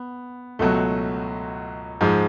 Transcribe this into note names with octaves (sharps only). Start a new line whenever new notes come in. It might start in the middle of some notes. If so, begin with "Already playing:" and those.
Already playing: B3
C#2 B2 F#3 A3
G#2 F3 G#3